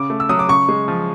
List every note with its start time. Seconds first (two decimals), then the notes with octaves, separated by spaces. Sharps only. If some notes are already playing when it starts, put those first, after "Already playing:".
Already playing: C#3 D6
0.10 A3
0.20 E6
0.29 F#3 D#6
0.39 D6
0.48 C#3 C#6
0.69 G#3
0.88 F3